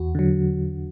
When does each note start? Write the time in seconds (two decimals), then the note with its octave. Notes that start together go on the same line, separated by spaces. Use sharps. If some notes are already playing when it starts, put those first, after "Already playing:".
Already playing: E2 F#4
0.15 D3 F#3